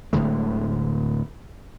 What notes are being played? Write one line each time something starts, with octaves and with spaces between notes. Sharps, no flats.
D1 A2 D3 G#3